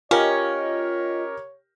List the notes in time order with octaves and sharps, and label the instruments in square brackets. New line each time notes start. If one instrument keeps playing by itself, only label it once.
[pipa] C#4 [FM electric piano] F4 D#5 [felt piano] G4 A#4 [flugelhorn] C#5